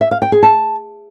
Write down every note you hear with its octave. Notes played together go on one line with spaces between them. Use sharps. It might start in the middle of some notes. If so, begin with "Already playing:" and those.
E5
F5
G5
G#4
A5